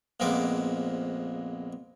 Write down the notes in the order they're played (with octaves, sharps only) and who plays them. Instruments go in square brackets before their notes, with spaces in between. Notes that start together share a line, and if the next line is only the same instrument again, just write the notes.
[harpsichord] A#1 F2 G#3 A#3 B3 D6